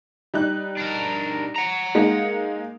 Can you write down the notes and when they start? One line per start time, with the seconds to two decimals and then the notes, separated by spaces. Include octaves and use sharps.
0.34 G3 D#4 F#6
0.77 D4 A#4
1.56 F#5 A#5
1.95 G#3 A#3 D#4